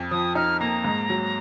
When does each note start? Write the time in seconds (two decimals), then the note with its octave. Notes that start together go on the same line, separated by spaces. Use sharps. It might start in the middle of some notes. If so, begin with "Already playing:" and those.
Already playing: F2
0.11 F3 D#6
0.35 D#4 F6
0.60 A#3 A#5
0.84 G#2
1.10 F#3